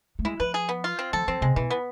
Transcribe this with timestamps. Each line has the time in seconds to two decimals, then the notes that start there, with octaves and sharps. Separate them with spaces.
0.19 A3
0.25 G#3 E4
0.40 F3 B4
0.54 G#4
0.69 B3
0.84 F4
0.99 C4
1.13 F3 A4
1.28 F3 C4
1.42 C3 G#3
1.56 B2 E3
1.70 B3